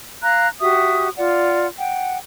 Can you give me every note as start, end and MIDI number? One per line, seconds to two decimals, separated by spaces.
0.22 0.48 77
0.22 0.48 82
0.22 0.48 90
0.60 1.08 66
0.60 1.08 67
0.60 1.08 76
0.60 1.08 87
1.17 1.67 65
1.17 1.67 74
1.17 1.67 78
1.78 2.17 78
1.78 2.17 79